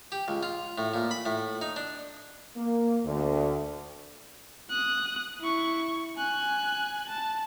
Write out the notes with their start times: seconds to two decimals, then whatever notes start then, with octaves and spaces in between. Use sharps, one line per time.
0.12 G4
0.28 C#2
0.43 F4
0.78 A2
0.94 A#2
1.11 B5
1.26 A2
1.62 D#4
1.76 D4
2.56 A#3
3.04 D2
4.70 D#6 F#6
5.41 E4 C#6
6.17 G#5 F#6
7.09 A5